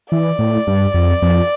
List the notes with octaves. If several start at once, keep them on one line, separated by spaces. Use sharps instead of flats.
E3 D5
A2
G2
F2
F2